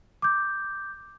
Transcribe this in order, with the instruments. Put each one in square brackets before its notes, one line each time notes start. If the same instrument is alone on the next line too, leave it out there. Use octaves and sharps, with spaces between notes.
[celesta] D6 G6